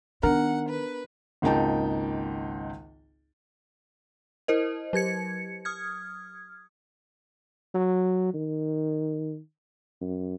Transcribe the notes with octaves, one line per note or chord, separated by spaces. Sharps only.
D#3 B3 D4 A#4 F#5
B4
G#1 C#2 A#3 D#4 G5 A5
E4 A#4 C5 D#5
F#3 G4 G#6 C#7
D#6 F6 G#6
F#3
D#3
F#2